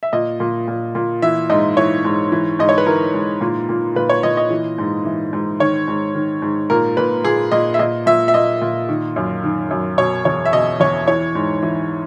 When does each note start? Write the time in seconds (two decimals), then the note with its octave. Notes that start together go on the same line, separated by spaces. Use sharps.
0.03 E5
0.13 A#2 D#5
0.40 A#2
0.68 A#2
0.95 A#2
1.22 E3 E5
1.50 G#2 D#5
1.77 E3 C#5
2.05 G#2
2.32 E3
2.59 G#2 D#5
2.69 C#5
2.78 B4
2.86 E3 A#4
3.14 G#2
3.41 A#2
3.69 A#2
3.96 A#2 B4
4.09 C#5
4.23 A#2 D#5
4.37 D#5
4.50 E3
4.78 G#2
5.05 E3
5.33 G#2
5.60 D#3 C#5
5.88 G#2
6.15 D#3
6.42 G#2
6.70 A#2 A#4
6.97 A#2 B4
7.24 A#2 G#4
7.52 A#2 D#5
7.74 E5
7.79 A#2 D#5
8.06 A#2 E5
8.28 E5
8.34 A#2 D#5
8.61 A#2
8.89 D#3
9.16 F#2
9.44 D#3
9.71 F#2
9.98 B2 C#5
10.25 E2 C#5
10.46 E5
10.53 B2 D#5
10.80 E2 C#5
11.08 E3 C#5
11.35 G#2
11.63 E3